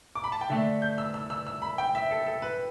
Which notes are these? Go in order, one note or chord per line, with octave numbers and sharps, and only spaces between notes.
D6
B5
A5
G5
D3 A3 D4 E5
G6
E6
E6
E6
E6
B5
G5
E5
A4
A4
B4